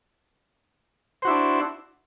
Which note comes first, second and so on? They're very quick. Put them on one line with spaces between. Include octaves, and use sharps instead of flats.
C5 F#4 E4 D4